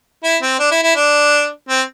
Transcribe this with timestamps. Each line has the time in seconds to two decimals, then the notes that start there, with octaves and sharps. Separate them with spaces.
0.24 E4
0.42 C4
0.59 D4
0.71 E4
0.83 E4
0.96 D4
1.69 C4